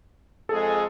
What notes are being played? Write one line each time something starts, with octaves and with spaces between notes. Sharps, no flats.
F2 G#3 G#4 A4